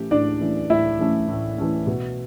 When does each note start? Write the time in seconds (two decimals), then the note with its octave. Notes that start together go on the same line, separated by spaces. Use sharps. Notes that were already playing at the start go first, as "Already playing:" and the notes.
Already playing: A2 E3 A3 C#4 G4
0.11 A2 D4 D5
0.41 E3 A3 C#4
0.70 A2 E4 E5
0.99 E3 A3 C#4
1.28 A2
1.58 E3 A3 C#4
1.87 B2